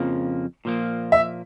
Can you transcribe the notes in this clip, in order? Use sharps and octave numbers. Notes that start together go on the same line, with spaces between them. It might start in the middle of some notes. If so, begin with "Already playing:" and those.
Already playing: F2 C#3 F3 A#3
A#2 F3 A#3
E5